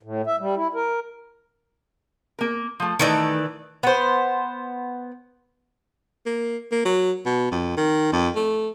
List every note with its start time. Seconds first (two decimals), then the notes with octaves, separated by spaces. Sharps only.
0.03 A2
0.27 E5
0.40 G3
0.57 E4
0.75 A#4
2.39 A#3 A#4
2.80 F3 A3
2.99 D#3 E3 A3 D#4 A4 D5
3.83 B3 C5
6.26 A#3
6.71 A#3
6.85 F#3
7.25 B2
7.51 F2
7.77 D#3
8.12 F2
8.35 A3